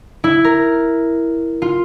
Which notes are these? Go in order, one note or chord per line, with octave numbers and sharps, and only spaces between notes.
E4
A#4
F4